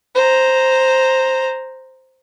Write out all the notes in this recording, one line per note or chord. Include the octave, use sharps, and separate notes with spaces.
C5 A#5